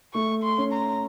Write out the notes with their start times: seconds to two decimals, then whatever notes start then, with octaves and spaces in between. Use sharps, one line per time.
0.14 A3 C#6
0.43 C6
0.58 C#4
0.73 A#5